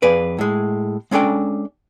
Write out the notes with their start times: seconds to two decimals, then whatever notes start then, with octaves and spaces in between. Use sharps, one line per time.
0.02 F2 G#4 B4 D5
0.38 A2 G#3
1.11 G#3 C#4 D4 A4 G5